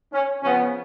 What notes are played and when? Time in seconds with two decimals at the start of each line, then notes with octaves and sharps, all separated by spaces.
0.13 C#4
0.42 C#3 F3 B3 C#4